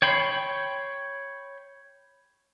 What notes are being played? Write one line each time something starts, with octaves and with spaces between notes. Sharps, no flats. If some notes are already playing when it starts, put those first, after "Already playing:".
C#5 G5 B5 C6